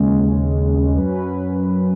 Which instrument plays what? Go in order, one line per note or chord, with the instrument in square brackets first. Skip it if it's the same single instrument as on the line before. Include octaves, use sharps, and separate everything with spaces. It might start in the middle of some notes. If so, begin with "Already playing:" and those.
Already playing: [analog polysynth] D#2 C#3 G#3 C#4
F#2 F#3 C#4 B4